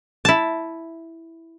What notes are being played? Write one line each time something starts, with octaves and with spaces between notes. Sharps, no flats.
E4 A5